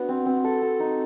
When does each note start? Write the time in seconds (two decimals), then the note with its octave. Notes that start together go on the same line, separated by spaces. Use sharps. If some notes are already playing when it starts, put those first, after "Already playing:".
Already playing: B3 D4 F#4
0.09 C4
0.26 C4
0.44 A4
0.62 A4
0.80 D#4